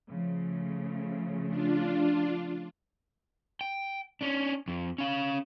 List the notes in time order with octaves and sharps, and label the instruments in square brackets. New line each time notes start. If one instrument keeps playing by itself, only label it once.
[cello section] C#3 F3 A3
[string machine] D4 F4
[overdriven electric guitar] G5
C#4 D4
F2
C#4 F5